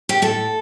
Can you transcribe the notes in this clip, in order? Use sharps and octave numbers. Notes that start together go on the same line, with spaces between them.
G4
A2 A4